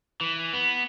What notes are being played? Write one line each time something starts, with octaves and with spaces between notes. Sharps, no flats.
E3
B3